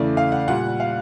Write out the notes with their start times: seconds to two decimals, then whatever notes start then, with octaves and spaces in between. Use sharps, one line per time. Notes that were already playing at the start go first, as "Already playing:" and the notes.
Already playing: E2 C#3 E3 A3 D5
0.17 F5
0.32 F#5
0.48 A#2 G3 F#5
0.80 F5